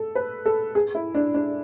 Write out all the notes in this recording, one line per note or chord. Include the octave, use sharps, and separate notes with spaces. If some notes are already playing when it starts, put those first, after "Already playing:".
Already playing: A4
B4
A4
G#4
E4
D4
D4